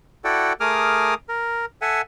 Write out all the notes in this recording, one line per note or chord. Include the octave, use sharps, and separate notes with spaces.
E4 F#4 A4 D5 F#5 G5
A3 G#4 A#4 D6 D#6 F6
A#4
A4 E5 F#5 G#5